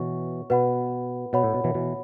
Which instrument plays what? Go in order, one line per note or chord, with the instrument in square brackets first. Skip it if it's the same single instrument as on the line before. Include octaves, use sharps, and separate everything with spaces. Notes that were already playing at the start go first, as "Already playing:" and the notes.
Already playing: [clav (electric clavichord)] B2 E3 [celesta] C#5 F#5 C#6
[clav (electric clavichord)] B2 [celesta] B4 F#5 B5
[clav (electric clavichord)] B2 [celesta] C#5 F#5 B5
[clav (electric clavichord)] A2
B2
B2 E3
B2 E3